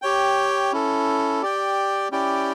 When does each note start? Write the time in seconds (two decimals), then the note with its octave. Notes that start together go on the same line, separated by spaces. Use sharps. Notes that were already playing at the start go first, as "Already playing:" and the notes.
0.02 G4 C#5 G5
0.73 C#4 E4 A4
1.43 G4 D5 G5
2.12 C#4 E4 G4 D5 G5